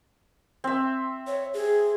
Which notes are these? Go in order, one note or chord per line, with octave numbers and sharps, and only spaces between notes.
C4 E5
C#5
G#4